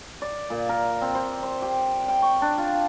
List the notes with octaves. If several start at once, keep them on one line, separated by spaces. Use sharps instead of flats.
D5
A#2
A#4
C4
C5
C5
G4
G5
C#6
D4
F4